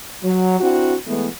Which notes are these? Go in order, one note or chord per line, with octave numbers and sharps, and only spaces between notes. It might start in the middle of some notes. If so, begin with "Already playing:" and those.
F#3
C4 D4 E4 F#4
E3 G#3 A3 B3